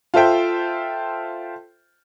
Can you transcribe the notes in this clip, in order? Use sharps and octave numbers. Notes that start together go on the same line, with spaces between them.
F4 A4 C5 E5 G5